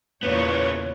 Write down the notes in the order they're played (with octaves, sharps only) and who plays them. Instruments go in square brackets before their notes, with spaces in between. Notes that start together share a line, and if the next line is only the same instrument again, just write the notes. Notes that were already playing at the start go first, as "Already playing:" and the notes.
[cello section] E2 A#2 C#5 [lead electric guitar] C#3 B3